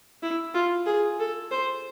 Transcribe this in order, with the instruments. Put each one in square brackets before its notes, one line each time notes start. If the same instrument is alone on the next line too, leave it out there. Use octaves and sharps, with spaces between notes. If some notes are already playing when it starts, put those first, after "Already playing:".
[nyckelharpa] E4
F4
G#4
A4
C5